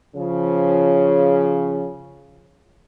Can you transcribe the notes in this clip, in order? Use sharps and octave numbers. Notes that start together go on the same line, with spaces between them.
C#3 F3